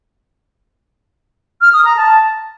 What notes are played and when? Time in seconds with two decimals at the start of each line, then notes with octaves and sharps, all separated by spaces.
1.61 F6
1.73 D#6
1.85 A#5
1.97 A5